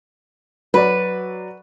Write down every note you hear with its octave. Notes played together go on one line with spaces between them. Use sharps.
F#3 B4 D5